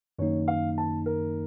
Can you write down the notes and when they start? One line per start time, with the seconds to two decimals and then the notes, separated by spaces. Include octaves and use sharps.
0.19 F#2 D#3 A#3 D#4 C#5
0.48 F5
0.78 A5
1.06 A#4